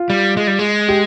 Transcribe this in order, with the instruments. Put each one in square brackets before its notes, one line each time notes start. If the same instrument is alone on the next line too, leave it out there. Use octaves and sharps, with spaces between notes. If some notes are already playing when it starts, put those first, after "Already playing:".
Already playing: [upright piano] F4
[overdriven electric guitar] G3
G#3
G3
G#3
[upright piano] G4